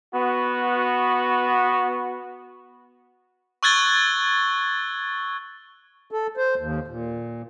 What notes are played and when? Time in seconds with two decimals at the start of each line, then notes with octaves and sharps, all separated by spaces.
0.15 B3 F#4
3.63 C#6 E6 F#6 G#6 A6 G7
6.11 A4
6.37 C5
6.57 D#2
6.88 A#2